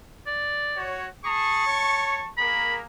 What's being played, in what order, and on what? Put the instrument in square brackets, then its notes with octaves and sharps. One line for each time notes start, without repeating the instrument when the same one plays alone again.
[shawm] D5
[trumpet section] F#4 C#5
[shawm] G#4 [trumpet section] A5 C#6
[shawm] C#5
[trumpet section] A#3 G#4 A#4 [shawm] B5